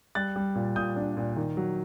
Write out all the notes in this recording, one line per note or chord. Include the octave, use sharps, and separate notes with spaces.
G3 F#6 A6
G3
A#2
A#2 D#6 G6
D4
A#2
D#3
F#3